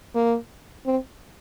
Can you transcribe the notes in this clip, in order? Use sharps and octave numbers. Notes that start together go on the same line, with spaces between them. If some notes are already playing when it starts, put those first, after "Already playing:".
A#3
C4